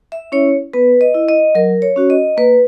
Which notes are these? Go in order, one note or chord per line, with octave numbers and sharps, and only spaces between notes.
E5
C#4 E4 C#5
B3 B4
D#5
E4
D#5
F#3 A#4
C#5
C#4 F#4
D#5
A#3 B4